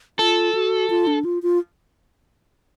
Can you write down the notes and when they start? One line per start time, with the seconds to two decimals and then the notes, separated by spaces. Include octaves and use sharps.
0.19 F4 A4
0.55 F#4
0.90 F4
1.07 D4
1.25 F4
1.43 F4